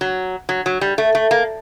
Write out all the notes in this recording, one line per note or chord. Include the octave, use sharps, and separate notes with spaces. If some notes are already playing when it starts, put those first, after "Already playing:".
F#3
F#3
F#3
G3
A3
A3
A#3